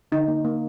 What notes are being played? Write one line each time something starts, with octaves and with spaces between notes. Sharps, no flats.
D3 D#4
A#3
A#3